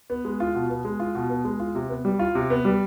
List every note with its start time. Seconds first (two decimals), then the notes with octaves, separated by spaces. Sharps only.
0.10 B3
0.25 G#3
0.40 F4
0.55 B2
0.70 B3
0.85 G#3
1.00 F4
1.15 B2
1.29 B3
1.45 G#3
1.60 F4
1.75 C3
1.89 B3
2.05 G3
2.19 F4
2.35 C3
2.50 B3
2.65 G3